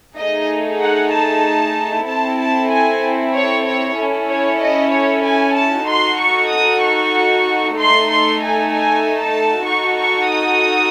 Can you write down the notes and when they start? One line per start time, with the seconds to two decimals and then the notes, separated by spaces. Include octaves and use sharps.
0.16 A3 D#4 G#4 D#5
0.80 F#5
1.12 A5
2.06 C4 E4 A4 A5
2.39 A5
2.70 G#5
3.34 C#5
3.65 C#5
3.96 C#4 E4 A4
4.28 C#5
4.60 D#5
4.91 C#5
5.23 G#5
5.55 A5
5.86 D#4 F#4 A4 C6
6.18 C#6
6.50 D#6
6.81 C#6
7.76 A3 D#4 A4 C6
8.08 C6
8.39 G#5
8.71 G#5
9.19 A5
9.66 D#4 F#4 A4 C#6
9.98 C#6
10.29 D#6